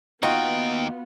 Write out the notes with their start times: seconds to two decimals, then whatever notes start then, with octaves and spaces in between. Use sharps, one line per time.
0.23 D#2 B3 D#4 F4 F#4 G5